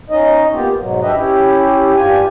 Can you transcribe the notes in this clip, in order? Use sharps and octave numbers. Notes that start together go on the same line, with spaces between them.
C#4 D#4 D#5
A#3 B3 F4 G4
G#2 B2 F#3
D4 G4 B4 D#5 E5
C#4 E4 G4
G2 F4 G4 G#5